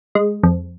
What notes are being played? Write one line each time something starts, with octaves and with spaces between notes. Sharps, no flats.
G#3
F2